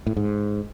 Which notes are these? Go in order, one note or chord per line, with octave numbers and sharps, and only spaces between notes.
A2
G#2